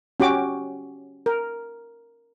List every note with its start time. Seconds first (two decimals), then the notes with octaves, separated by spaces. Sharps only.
0.20 C#4 F#4 G4 D6
1.26 A#4